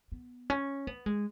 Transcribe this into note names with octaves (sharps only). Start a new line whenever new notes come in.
B3
C#4
B3
G#3